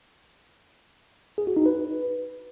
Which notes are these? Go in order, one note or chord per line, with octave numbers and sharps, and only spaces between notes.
G#4
F#4
D#4
B4